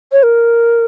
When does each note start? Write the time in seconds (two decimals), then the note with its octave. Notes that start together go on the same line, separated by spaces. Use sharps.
0.12 C#5
0.23 A#4